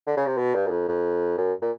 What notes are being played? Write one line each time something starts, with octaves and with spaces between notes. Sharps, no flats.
D3
C#3
C3
B2
G2
F#2
F2
F2
F#2
A#2